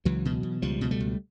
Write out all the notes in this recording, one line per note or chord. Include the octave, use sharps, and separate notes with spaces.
C#2 E3 F#3
B2
B2
C#2 F3 G3
B2
G3 A3
C#2